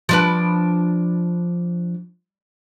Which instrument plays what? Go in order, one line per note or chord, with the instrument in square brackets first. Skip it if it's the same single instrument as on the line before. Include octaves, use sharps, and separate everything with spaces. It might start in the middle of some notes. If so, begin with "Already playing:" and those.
[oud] F3 D4 B4